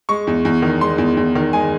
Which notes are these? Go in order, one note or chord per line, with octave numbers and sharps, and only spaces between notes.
G#3 C#6
E2
E2
D#3
G#3 C6
E2
E2
D#3
G#3 G#5